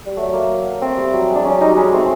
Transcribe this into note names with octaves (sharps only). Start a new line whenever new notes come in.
G3
F#3 A3
A#3
A3 C4
G3
F#3
G#3
D4
F#3 C#4
G3 D#4
G#3 C#4
A3 C4